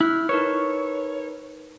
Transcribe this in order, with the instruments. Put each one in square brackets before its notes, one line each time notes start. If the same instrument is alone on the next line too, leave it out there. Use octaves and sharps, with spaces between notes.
[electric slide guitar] E4 [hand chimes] F6 F#6
[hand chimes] D#4 A#4 B4 [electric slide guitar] C#5